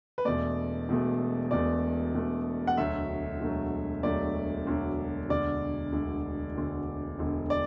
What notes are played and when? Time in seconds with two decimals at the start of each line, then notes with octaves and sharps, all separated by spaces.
0.18 B4
0.25 E1 E2 B2 A3 D5
0.89 E1 E2 B2 A3
1.51 E1 E2 B2 A3 D5
2.15 E1 E2 B2 A3
2.67 F#5
2.77 E1 D2 D3 F#3 A3 E5
3.40 E1 D2 D3 F#3 A3
4.03 E1 D2 D3 F#3 A3 D5
4.67 E1 D2 D3 F#3 A3
5.29 E1 D2 D3 D5
5.92 E1 D2 D3
6.56 E1 D2 D3
7.19 E1 D2 D3
7.50 D5